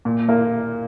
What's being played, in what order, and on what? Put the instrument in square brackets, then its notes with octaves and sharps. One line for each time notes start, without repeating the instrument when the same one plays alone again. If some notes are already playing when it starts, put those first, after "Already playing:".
[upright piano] A#2
A#3